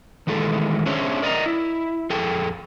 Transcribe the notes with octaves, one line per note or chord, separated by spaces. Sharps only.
D#3 E3 G#3 A3 A4
C#4 D4 G#4 C5 C#5 E5
A#4 D5 D#5 A5 A#5
E4
F2 G#4 A4 G5